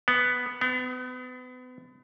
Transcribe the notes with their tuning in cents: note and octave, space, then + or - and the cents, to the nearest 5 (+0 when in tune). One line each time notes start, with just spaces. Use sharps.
B3 +0
B3 +35